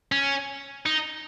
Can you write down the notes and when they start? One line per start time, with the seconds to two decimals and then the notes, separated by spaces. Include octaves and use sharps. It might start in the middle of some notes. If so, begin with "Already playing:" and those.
0.12 C#4
0.86 D#4